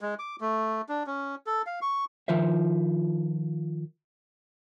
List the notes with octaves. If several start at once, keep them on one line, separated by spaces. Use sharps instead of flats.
G#3
D6
A3
D4
C#4
A4
F5
C#6
D#3 F3 F4 C5 E5